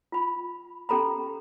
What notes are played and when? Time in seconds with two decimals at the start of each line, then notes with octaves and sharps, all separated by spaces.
0.12 F4 B5
0.89 C#4 G4 A4 A#5 B5